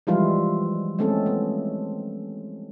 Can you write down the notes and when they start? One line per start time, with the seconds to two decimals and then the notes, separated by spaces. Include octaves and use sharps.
0.07 E3 F3 G3 G#3 E4 F4
0.99 G#3 A3 C4 C#4 A4
1.26 B3